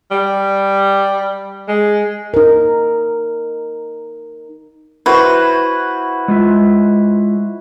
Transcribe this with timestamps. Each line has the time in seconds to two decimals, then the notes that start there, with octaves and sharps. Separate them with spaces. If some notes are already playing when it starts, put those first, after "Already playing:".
0.11 G3
1.68 G#3
2.34 D#4 A#4
5.06 E4 F#4 B4 C5
6.28 G#3 F4 E5